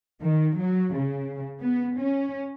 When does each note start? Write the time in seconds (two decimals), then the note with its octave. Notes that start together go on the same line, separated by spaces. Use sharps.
0.22 D#3
0.59 F#3
0.96 C#3
1.62 B3
1.98 C#4